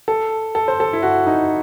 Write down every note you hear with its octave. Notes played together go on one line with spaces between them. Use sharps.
A4
A4
C5
A4
E4
F#4
D#4